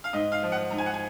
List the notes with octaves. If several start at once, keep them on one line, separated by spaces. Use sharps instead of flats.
F5
G#2 D#5
F5
F3
F#5
G#2 A#5
G#5
F#5
G#5